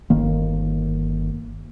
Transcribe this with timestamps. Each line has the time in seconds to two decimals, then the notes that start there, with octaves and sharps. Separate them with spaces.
0.10 G1 D#3 A#3